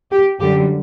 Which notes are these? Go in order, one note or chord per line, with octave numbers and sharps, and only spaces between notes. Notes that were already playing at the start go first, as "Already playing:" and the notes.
G4
F#2 D3 G3 G4